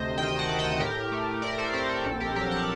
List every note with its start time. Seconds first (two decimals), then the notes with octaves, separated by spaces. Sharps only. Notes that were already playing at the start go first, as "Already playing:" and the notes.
Already playing: D2 C3 C5 D#5
0.18 D#3 D#5 G5
0.39 F#5 A5
0.49 A3
0.59 D#5 G5
0.80 A2 G4 A#4
1.12 A3
1.42 A2 A#4 D5
1.58 A4 C5
1.74 C4 G4 A#4
1.89 A4
2.05 A#1 A4
2.20 G4 A#4
2.36 F#3 G4 A#4
2.51 F#5 A5